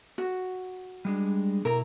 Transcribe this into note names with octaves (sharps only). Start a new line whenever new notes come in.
F#4
G3 G#3 D4
B2 E4 A#4 A#5